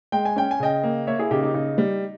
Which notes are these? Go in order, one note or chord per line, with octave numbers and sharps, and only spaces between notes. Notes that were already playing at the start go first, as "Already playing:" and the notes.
G#3 G5
G#5
C#4 G5
G#5
C#3 D#5 G5
A#3
A#3 C#5 E5
E4 G#4
C#3 D#4 G4
D#4 G4
C#3 D#4
G3